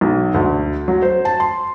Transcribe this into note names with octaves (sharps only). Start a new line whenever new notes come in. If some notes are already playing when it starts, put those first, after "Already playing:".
B1
D2
F#3
C5
A5
C6